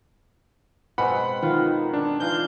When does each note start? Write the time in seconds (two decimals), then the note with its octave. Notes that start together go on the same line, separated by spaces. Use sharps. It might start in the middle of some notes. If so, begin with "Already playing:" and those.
0.98 B2 G#3 C4 F#5 B5
1.42 D#3 F4
1.94 D4
2.20 E3 D#4 F4 G6